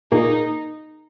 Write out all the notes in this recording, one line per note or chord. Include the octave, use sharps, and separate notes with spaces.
A#2 A#3 D#4 G#4